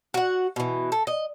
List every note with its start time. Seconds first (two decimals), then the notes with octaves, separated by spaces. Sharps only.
0.14 F#4 F#5
0.56 B2 E3
0.92 A4
1.07 D#5